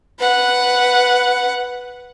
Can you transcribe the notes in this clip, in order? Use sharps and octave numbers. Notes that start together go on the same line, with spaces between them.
B4 F#5